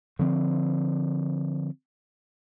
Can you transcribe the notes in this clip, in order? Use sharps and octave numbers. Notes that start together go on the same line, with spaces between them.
D3 F3 C4